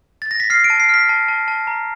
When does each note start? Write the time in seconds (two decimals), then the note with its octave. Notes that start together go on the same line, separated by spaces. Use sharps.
0.22 A6
0.31 A#6
0.40 B6
0.50 F6 C7
0.64 D7
0.70 A5
0.80 C7
0.89 F6 B6
1.09 A5
1.28 A5
1.48 A5
1.67 A#5